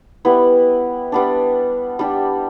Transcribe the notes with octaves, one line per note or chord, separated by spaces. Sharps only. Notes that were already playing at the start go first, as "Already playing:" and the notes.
G3 B3 E4 B4
G3 B3 D4
G3 D4 G4